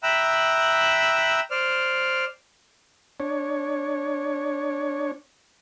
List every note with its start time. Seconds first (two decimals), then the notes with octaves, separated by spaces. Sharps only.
0.03 E5 G5 A#5 B5 E6 F#6
1.51 C5 D5 F6
3.20 D4 C#5